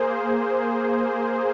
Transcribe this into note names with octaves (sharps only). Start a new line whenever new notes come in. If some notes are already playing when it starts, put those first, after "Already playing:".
Already playing: A#3 G#4 C5